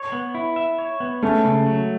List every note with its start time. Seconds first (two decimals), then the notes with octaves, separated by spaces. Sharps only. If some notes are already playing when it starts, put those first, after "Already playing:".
Already playing: C#5
0.12 B3
0.35 E4
0.56 E5
0.78 C#5
1.00 B3
1.23 A3 C#4
1.44 C#3
1.66 F#3